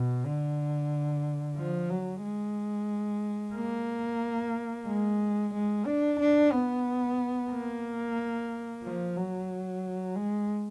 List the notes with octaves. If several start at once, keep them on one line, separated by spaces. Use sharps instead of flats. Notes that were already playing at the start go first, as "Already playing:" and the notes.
Already playing: B2
D3
F3
F#3
G#3
A#3
G#3
G#3
D4
D4
B3
A#3
F3
F#3
G#3